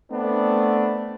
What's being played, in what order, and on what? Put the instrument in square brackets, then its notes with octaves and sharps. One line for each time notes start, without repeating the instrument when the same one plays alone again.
[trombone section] A3 B3 C4 D4